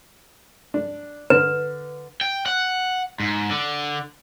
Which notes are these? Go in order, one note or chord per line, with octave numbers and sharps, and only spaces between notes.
D4
D3 B4
G5
F#5
G#2
D3